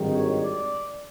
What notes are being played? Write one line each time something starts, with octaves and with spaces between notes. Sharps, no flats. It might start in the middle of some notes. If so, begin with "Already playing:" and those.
Already playing: G#1 G2 D#3
C#5
D5